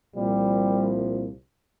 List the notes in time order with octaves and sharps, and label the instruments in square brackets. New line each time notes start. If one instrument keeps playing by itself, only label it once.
[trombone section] C2 A#2 F3 G3